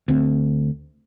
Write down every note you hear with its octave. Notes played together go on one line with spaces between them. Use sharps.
D2 C4